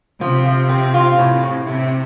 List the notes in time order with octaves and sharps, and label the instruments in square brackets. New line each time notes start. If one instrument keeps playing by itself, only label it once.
[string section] C3 [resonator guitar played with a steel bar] F3
[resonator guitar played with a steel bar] F3
C4
F4
[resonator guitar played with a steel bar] A2 [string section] C3
[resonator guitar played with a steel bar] A2
[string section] C3 [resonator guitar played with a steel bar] E4